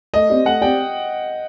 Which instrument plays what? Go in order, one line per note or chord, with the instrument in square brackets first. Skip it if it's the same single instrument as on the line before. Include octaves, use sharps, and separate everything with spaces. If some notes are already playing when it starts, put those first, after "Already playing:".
[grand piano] A3 [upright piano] D#5
[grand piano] C4 G4 D5
[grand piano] A3 [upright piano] F#5
[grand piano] C4 G4 D5 [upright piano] G5